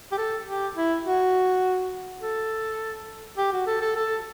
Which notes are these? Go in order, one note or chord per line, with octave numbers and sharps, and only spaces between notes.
G4
A4
G4
E4
F#4
A4
G4
F#4
A4
A4
A4